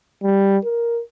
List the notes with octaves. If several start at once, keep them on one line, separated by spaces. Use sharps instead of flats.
G3
A#4